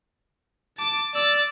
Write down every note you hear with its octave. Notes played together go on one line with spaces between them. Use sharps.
A5 D6
D5 E6 A6